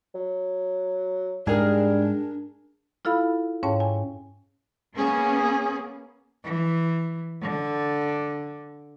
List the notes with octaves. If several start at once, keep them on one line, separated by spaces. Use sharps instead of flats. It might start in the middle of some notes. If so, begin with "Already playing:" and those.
F#3
G#2 G3 D4 G#4 A#4
E4 F4 A4 F5 B5
G#2 C#4 C#5 F5 G5 A5
G#5
A#3 B3 C#4 G#4
E3
D3